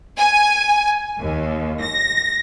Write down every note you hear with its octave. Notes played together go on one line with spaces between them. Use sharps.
G#5
D#2
A#6